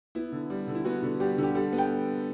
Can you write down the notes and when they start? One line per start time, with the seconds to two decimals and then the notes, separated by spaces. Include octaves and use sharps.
0.15 B3 E4
0.32 D3
0.50 G3
0.68 D3
0.75 E4
0.85 B3 F#4
1.03 D3
1.20 G3 G4
1.38 D3 G4
1.55 G3 A4
1.72 B3
1.78 G5